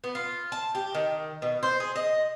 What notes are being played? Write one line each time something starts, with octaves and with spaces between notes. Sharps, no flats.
B3
F4
A5
G4
D#3
B2
C5
G#4
D#5